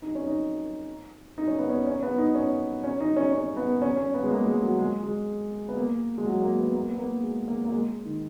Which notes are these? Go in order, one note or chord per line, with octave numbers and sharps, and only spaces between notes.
D#4
C#4
D#4
D#4
C#4
B3
C#4
C#4
B3
D#4
C#4
C#4
D#4
C#4
C#4
B3
C#4
C#4
B3
G#3
A#3
G#3
F#3
G#3
G#3
B3
A#3
G#3
F#3
A#3
B3
A#3
B3
A#3
G#3
A#3
A#3
G#3
D#3